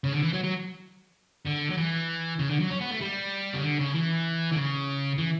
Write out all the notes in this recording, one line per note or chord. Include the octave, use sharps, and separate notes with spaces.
C#3
D3
E3
F#3
F#3
D3
F#3
E3
C#3
D3
F#3
C#4
B3
A3
G3
C#3
D3
C#3
E3
D3
C#3
E3